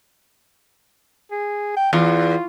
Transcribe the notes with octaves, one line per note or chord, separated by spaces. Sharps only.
G#4
G5
E2 F4